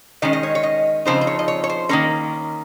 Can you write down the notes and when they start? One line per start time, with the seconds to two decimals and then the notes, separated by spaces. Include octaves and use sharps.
0.22 D#3 G#3 C#4 D#5
0.33 D#5
0.43 C#5
0.55 C#5
0.63 D#5
1.05 C#3 F3 C4 D#4 C5
1.21 C5
1.27 C#5
1.39 D#5
1.48 C#5
1.64 C#5
1.69 C5
1.89 D#3 A#3 C#4 A#4